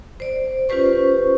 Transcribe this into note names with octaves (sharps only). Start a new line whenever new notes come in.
C5 D5
C#4 F4 G4 B4 C5 C#6